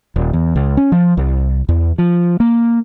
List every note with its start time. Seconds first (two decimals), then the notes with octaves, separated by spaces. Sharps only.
0.16 D#1
0.33 E2
0.56 C#2
0.77 C#4
0.92 F3
1.17 C2
1.69 E2
1.98 F3
2.40 A#3